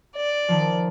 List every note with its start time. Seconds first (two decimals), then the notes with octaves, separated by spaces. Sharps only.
0.15 D5
0.48 D#3 F3